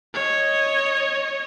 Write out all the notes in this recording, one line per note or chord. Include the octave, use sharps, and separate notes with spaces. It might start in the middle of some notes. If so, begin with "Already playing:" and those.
C#5 D#5